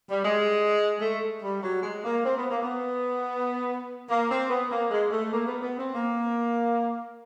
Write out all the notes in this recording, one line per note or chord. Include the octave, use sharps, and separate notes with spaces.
G3
G#3
A3
G3
F#3
G#3
A#3
C4
B3
A#3
B3
A#3
C4
B3
A#3
G#3
A3
A#3
B3
B3
C4
A#3